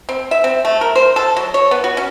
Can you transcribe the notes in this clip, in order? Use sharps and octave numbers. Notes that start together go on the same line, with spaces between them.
C4
E5
C4
A3
A#4
C5
A4
F#3
C#5
B3
F#4
C#4